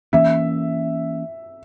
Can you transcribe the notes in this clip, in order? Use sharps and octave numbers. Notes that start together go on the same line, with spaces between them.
E3 A#3 C#4 E5